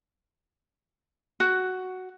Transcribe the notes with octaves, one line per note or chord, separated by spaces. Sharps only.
F#4